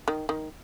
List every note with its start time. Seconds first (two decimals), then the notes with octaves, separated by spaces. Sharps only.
0.08 D#3
0.29 D#3